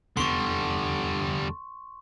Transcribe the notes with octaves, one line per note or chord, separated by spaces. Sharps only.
F1 E2 D3 G3 B3 C6 C#6